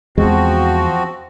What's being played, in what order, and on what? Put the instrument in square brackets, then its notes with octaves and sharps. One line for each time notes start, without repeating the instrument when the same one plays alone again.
[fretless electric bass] E2 G#3 [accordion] F3 C4 F#4